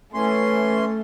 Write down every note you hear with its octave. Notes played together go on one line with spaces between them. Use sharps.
E3 A3 C#4 C6